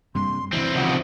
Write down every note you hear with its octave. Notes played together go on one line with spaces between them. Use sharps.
G2 C3 C6
D2 C3 E3 C4 E4
C#3 F3 F#5